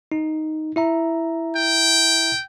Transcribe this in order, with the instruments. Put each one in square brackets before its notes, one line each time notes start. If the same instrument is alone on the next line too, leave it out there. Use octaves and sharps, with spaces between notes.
[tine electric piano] D#4
E4 E5 A#5
[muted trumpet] G5